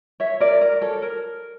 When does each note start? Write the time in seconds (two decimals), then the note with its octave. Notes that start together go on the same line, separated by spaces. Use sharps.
0.20 C#5 E5
0.40 A#4 D5
0.61 A#4 D5
0.81 A4 C#5
1.02 A#4